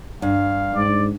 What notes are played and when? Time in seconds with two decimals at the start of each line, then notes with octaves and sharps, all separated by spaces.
0.22 G2 F5
0.74 G#2 D5